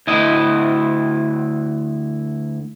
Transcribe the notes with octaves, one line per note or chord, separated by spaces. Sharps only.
D2 E4 D#5